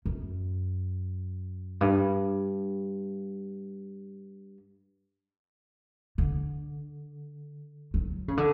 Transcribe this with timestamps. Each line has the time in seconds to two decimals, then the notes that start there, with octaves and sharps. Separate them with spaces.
0.06 F#2
1.81 G2
6.18 D3
7.94 F#3
8.28 C#3
8.37 D3